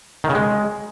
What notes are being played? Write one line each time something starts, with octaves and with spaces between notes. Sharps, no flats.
D#3
C#3
G#3